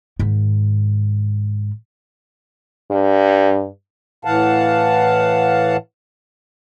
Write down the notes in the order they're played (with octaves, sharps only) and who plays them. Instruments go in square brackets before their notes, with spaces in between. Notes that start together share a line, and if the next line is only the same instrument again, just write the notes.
[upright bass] G#2 D#3
[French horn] G2
[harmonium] A2 E3 F5 F#5 A5